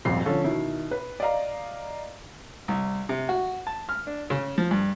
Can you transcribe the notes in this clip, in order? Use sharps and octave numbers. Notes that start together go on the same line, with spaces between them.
D#1 G#1 F2 C7
D3 F3 C#4 A4
B2 D#3 E4
B4
D5 D#5 F5 A#5
C2
C3
F#4
A5
F6
D4
C#3
F3
G2